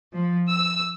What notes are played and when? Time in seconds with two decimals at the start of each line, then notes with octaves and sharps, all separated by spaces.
0.15 F3
0.49 E6